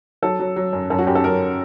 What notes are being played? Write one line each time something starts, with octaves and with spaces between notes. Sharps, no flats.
F#3 A4
F#3
F#3
F#2
F#2 A4
F#4
F#2 G4
A4
F#2 A#4